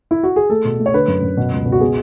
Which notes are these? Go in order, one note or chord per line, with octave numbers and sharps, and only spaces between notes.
E4
F#4
G#4
A3 A4
B2
A3
C#5
D3 B4
F#2
F#2
B2
C#2
B2
F#4
B3 G#4